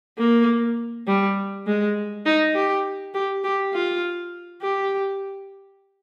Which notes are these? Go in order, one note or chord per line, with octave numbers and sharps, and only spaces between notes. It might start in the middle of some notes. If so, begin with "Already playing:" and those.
A#3
G3
G#3
D#4
G4
G4
G4
F4
G4